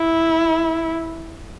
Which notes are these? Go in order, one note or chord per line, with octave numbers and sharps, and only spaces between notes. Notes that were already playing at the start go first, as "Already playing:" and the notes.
Already playing: E4